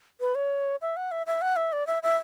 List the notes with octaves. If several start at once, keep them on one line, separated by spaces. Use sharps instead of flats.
B4
C#5
E5
F#5
E5
E5
F#5
E5
D5
E5
E5